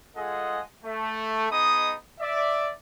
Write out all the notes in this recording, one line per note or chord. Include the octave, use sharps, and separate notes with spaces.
G#3 F4 G#4 A4 D#5 F#5
A3
B3 D#4 G#4 D#5 D#6
D5 E5